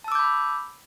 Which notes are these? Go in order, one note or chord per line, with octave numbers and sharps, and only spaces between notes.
A5 B5 D6 E6 G6